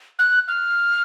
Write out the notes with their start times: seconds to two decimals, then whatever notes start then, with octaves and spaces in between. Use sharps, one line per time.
0.19 F#6
0.48 F6